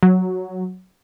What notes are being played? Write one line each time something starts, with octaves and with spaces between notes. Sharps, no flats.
F#3